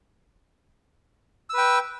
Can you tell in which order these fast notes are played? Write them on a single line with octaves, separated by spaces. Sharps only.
E6 B4 G5